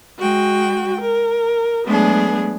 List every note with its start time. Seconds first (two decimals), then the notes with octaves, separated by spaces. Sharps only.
0.18 G#3 F#4 G5
1.02 A#4
1.85 F#3 G#3 A3 B3 D4 G#4